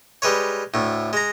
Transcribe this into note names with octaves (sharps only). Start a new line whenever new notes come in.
G3 G#3 B4 C#5
D2 A2
G#3 A#5